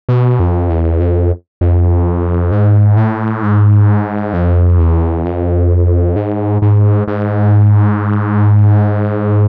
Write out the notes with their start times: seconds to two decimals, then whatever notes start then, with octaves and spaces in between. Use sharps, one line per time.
0.09 B2
0.39 F2
0.69 E2
1.00 F2
1.61 F2
2.52 G#2
2.97 A2
3.43 G#2
4.34 F2
4.79 E2
5.25 F2
6.16 G#2
6.62 G#2
7.08 G#2